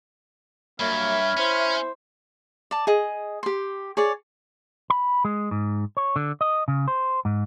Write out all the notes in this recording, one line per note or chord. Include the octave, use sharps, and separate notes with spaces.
G2 F#3 A#3 C#5 E5 B5 F6
C#4 E4 C5
D5 A5
G#4 D#5
G4 C6
G#4 C#5 D5
B5
G#3
G#2
C#5
D3
D#5
C#3
C5
G#2